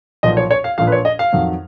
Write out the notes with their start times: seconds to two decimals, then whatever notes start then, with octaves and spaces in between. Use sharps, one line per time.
0.23 B1 A#2 F3 D#5
0.37 C#5
0.51 C#5
0.64 F5
0.78 A#1 A#2 F3 F5
0.87 B4
0.92 C#5
1.05 D#5
1.19 F5
1.33 F2 D#3 F#3